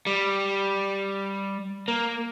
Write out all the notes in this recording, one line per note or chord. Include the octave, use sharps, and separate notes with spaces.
G3
A#3